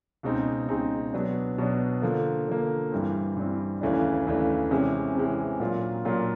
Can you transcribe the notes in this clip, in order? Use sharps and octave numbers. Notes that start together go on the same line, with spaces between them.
C#2 B2 G#3 C4 D#4
C#2 B2 G#3 C4 D#4
B2 F#3 B3 D4
B2 F#3 B3 D4
D3 F3 A#3
D3 F3 A#3
G2 E3 G3 C4
G2 E3 G3 C4
D#2 C#3 E3 A3 D4
D#2 C#3 E3 A3 D4
C3 E3 G#3 C#4
C3 E3 G#3 C#4
A#2 F#3 A#3 D4 F4
A#2 F#3 A#3 D4 F4